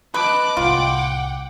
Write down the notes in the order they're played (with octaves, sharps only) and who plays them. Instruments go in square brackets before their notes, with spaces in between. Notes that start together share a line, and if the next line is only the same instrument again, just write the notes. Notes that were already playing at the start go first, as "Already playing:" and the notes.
[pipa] B4 [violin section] D#5 A5 F#6 [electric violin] D6
[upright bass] C2 A2 [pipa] F4 [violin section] F#5 G5